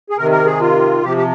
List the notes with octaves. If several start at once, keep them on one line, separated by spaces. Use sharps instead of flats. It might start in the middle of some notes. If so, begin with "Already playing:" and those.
G#4
C3 D#3 A#4
A#4
G#4
F4
C3 F3 G4
G4